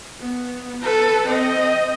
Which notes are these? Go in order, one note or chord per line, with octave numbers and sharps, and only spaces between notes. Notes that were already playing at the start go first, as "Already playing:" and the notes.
B3
A4 B4
C4 D#5